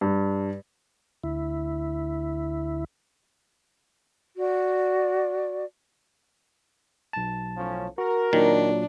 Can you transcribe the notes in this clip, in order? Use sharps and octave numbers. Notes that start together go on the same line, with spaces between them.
G2
D2 E4
F#4 D5
B1 A5
A2 F3 C#4
F#4 A#4
A#2 D#3 F#3 D4